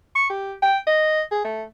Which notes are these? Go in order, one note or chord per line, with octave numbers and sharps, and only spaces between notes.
C#6
G4
G5
D#5
G#4
A3